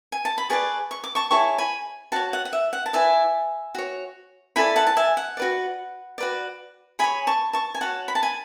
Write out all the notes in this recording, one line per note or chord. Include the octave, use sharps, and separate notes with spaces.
G#5
A5
B5
G#4 B4 D5 A5 C#6
C#6
D6
A5 C#6
E4 G#4 C#5 A5 C#6
G#5 B5
F#4 C#5 F#5 A5
F#5
F#5
E5
F#5
A5
E4 B4 D5 E5 G#5
F#4 C#5
E4 A4 D5 G#5 B5
F#5 A5
A5
E5 G#5
F#5
F#4 B4 D5
F#4 B4 D5
G#4 C#5 G#5 B5
A5 C#6
A5 C#6
G#5
F#4 C#5 F#5 A5
B5
A5
G#5 B5